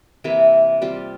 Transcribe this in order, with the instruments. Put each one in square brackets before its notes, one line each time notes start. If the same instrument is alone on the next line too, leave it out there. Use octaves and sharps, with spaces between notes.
[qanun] C3 E3 A#3 E4
G3 C4 F4